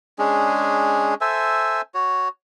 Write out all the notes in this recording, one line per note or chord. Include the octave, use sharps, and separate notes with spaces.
G#3 C#4 D4 G#4
A4 C5 E5 G#5
F#4 C#5